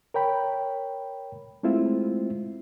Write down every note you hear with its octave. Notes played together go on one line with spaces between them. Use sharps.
A#4 C#5 G5 B5
G#3 A3 C4 E4 F4 C5